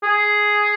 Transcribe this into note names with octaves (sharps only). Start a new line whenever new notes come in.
G#4